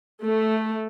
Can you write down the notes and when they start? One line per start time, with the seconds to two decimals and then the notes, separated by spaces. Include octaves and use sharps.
0.23 A3